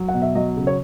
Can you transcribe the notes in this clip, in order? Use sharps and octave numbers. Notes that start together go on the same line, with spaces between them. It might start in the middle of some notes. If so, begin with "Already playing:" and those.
Already playing: F#3
F#5
B2
E5
F#3 D#5
C#3
C#5